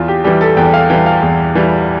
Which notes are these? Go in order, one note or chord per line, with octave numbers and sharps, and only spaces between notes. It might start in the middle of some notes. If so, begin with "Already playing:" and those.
Already playing: E2 F4
G4
E3 G3 G4
A4
E2 G5
F5
E3 G3 G5
F5
E2
E3 G3